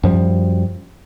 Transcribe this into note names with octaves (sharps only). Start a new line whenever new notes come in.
F#2 F3 G3